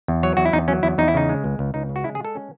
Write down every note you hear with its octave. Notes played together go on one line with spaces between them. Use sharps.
E2
F#3 C#5
E2 F#4
E4
E2 D#4
F#3 C#4
E2 E4
E2 D#4
E4
C#3 D#4
G#3
C#2
C#2
C#2 D#4
C#3
F#4
G#3 E4
G#4
G#3
A4
C#4